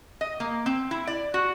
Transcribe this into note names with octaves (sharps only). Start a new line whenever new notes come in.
D#5
A#3
C4
E4
D5
F#4